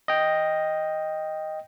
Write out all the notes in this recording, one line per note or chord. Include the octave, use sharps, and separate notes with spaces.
D#5 G5